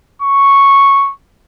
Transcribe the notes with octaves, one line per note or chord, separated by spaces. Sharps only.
C#6